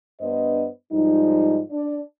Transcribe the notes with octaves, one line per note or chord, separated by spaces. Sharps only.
G2 B3 D4 C5 D#5
G#2 F3 G3 D#4
D4 D5